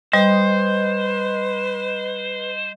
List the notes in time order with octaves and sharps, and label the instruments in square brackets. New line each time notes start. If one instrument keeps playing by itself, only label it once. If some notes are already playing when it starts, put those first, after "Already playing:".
[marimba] G3 [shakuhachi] B4 [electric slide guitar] C5 [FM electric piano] D#5